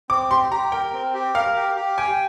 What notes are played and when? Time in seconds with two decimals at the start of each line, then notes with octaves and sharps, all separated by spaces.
0.10 C4 D6
0.30 G4 C6
0.52 G4 A#5
0.72 A#4 G5
0.93 C4
1.14 G4
1.35 A#4 F5
1.56 G4
1.76 G4
1.98 G5 G#5